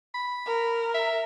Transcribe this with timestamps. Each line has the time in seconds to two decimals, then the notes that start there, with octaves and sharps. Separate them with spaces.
0.14 B5
0.46 A#4
0.94 E5